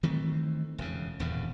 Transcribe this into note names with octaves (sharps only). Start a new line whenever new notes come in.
D#3 E3 A3 C4
E1 F2 C#3
D#1 E2 G2 C#3